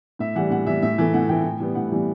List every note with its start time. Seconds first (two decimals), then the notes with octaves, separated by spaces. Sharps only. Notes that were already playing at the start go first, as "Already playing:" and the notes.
0.19 A2 E5
0.35 E3 G3 F#5
0.50 A2 F#5
0.67 E3 G3 E5
0.82 A2 E5
0.98 E3 A3
1.14 A2 F#5
1.29 E3 A3 G5
1.44 A2
1.60 E3 G3 B3
1.75 A2 F#5
1.92 E3 G3 B3